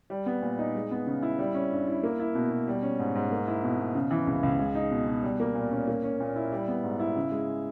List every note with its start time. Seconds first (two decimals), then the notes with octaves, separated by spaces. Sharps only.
0.10 G3
0.26 B3
0.42 A#2
0.59 D#4
0.75 G#3
0.91 B3
1.07 C#3
1.22 E4
1.39 G3
1.54 C#4
1.71 G2
1.87 E4
2.03 A#3
2.20 E4
2.35 B2
2.51 B2
2.68 G3
2.82 C#4
2.99 G#2
3.15 G#2
3.32 A#3
3.48 E4
3.63 B2
3.79 B2
3.95 C#3
4.11 E3
4.27 C#2
4.43 C#2
4.59 G#3
4.75 D#4
4.91 B2
5.07 B2
5.23 G3
5.40 A#3
5.55 A#2
5.71 C#4
5.87 A#3
6.03 C#4
6.20 A#2
6.36 E4
6.52 G3
6.68 B3
6.83 G#2
7.00 E4
7.16 C#3
7.32 G#3